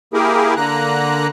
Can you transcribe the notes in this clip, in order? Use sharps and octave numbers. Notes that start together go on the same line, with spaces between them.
A#3 E4 G4 G#4 A#4
D3 A#3 A#5 F#6